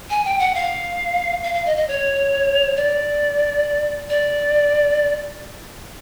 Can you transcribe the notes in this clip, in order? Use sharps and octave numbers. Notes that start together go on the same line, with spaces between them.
G#5
G5
F#5
F5
F5
F5
D#5
D#5
C#5
D5
D5